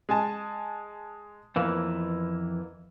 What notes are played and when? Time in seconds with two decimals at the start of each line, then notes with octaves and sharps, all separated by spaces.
0.09 G#3 G#5 A5
1.56 F2 E3 A#3 B3